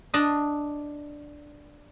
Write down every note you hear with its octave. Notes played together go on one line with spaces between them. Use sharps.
D4 D#5